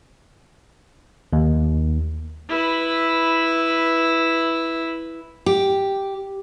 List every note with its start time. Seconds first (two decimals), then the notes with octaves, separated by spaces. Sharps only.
1.33 D#2
2.49 E4 B4
5.46 G4